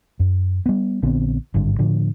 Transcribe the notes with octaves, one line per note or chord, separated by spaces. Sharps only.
F#2
G3 B3
A#1 D3 B3 C4
G#1 G2 D3
A2 D3 F3